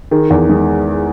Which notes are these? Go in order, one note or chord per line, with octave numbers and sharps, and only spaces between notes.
D#3 G#4
E2
G#3